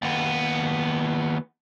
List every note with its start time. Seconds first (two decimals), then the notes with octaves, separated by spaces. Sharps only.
0.02 D#2 B3